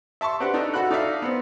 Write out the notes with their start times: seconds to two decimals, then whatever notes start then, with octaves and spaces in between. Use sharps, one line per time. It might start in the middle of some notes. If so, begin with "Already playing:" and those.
0.21 E5 A5 C6 C#6
0.40 C4 D4 G4 B4 F#5
0.54 D4 D#4 A4 D#5
0.74 F#4 A4 F#5 B5 F#6
0.91 D#4 D5 E5 F5
1.22 B3 C4